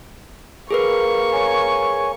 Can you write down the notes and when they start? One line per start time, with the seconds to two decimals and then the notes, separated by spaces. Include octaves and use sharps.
0.71 A#3 G#4 A#4 B4 C#6
1.33 C#5 G#5